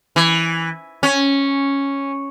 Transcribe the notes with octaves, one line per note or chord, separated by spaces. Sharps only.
E3
C#4